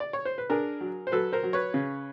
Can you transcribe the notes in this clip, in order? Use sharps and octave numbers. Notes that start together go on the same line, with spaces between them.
D5
C#5
C5
B4
D4 G#4 A#4
F#3
C5
F#3 A4 B4
A#4 C5
F#3
B4 C#5
C#3